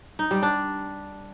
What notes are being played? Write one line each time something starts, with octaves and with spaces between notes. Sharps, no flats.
D#4
G3
D4